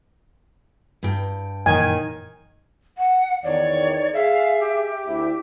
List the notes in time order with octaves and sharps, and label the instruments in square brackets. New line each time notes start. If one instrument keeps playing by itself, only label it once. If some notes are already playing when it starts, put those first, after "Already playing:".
[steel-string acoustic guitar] G2 G5
[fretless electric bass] F#2 A#2 E3 [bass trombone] D#3 [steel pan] G#5
[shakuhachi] F#5
[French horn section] E2 D#3 [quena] C#5 [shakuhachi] D5
[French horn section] G#4 [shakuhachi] E5 [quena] F5
[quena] G4
[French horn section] D2 E4 [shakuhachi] E5